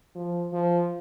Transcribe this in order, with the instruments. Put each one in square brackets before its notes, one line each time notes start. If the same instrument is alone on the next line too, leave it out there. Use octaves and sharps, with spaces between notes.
[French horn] F3
F3